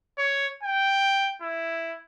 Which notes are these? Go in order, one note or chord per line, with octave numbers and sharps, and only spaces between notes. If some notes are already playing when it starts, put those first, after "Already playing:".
C#5
G5
E4